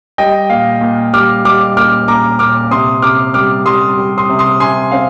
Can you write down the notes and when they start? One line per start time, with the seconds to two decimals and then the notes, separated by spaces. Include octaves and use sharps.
0.18 G3 D#5 G5
0.50 A#2 F5
0.81 A#2
1.13 G3 D6 F6
1.45 G3 D6 F6
1.76 A#2 D6 F6
2.08 A#2 A#5 D6
2.39 A#2 D6 F6
2.71 C3 C6 D#6
3.02 C3 D6 F6
3.34 G3 D6 F6
3.66 G3 C6 D#6
3.98 G3
4.18 C6 D#6
4.29 C3
4.39 C6 D#6
4.60 C3 G#5 C6
4.91 C4 F5